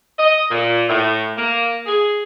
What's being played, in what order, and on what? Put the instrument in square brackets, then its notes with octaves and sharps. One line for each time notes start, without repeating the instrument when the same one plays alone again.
[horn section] D#5
A#2
A2
A#3
G#4